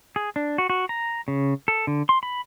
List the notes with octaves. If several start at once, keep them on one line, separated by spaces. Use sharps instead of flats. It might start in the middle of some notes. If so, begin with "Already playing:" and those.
G#4
D4
F#4
F#4
A#5
C#3
A4
D3
C6
B5